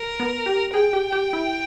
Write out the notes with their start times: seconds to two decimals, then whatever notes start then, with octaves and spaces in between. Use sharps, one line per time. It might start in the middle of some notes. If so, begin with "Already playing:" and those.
Already playing: A#4
0.20 B3
0.46 G4
0.73 G#4 G5
0.93 G4
1.12 G4
1.33 E4